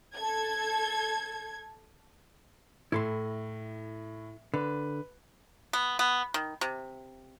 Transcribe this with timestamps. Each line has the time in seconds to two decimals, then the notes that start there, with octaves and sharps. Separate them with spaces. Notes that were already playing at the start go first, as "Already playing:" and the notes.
0.15 A4 G#6
2.92 A2 E4 A4 C6
4.54 D3 B4
5.73 B3
5.99 B3
6.34 D#3
6.61 C3